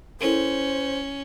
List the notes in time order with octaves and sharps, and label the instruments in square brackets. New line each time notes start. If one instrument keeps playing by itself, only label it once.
[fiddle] C#4 [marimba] E4 A4 A#4 [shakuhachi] C5